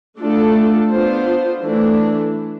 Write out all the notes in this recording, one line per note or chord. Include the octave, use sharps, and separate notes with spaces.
A3 D4 F4 A4
B3 D4 F4 C5
E3 A3 D4